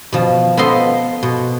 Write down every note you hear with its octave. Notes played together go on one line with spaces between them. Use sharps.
B2 F3
B3 F4 A4 C5 D#5 C6
B2